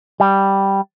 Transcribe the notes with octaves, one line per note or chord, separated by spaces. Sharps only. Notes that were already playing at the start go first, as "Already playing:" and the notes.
G3